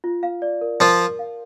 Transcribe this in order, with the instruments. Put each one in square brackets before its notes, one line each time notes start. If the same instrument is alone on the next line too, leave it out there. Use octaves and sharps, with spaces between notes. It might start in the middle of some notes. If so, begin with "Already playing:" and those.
[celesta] F4
F5
D5
A#4
[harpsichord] F3 F4 [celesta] A#4
[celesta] A#4
F5